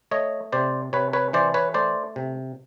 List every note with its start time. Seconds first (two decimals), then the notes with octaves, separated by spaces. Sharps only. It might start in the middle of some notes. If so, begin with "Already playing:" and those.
0.11 A3 C#5 D#5
0.52 C3 C5 D5
0.93 C3 B4 C#5
1.13 B4 C#5
1.33 E3 C5 D5
1.54 B4 C#5
1.74 A3 C5 D5
2.16 C3